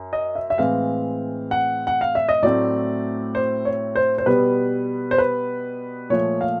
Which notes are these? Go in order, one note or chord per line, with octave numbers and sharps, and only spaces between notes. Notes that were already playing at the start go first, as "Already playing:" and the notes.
Already playing: F#2
D#5
E5
E5
A2 E3 G#3 C4 F5
F#5
F#5
F5
E5
D#5
A2 F#3 A3 C4 D5
C5
C#5
C5
C5
B2 G3 B3 B4
C5
B4
A#2 F3 A3 C#5
F5